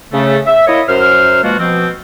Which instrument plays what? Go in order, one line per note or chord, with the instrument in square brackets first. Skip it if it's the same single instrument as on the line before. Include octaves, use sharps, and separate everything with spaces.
[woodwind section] C#3 A3
E5
A#3 E4 A#4 C#5 D#5
F#2 C5 F6
B2 F3 G#3 A#3 F4 F#4
B2 F3 C4